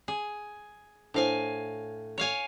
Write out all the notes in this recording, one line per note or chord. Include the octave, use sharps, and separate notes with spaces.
G#4
A2 D4 E4 C5 F5 G#5
C#5 F5 G#5